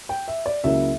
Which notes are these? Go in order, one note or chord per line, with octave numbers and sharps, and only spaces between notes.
G5
E5
D5
C#2 C#3 F#3 A#3 E4 E5